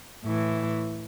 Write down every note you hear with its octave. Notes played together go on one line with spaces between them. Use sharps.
A2 E3